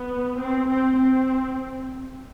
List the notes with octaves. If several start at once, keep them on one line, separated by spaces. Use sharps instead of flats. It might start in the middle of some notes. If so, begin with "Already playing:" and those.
Already playing: B3
C4
C4
C4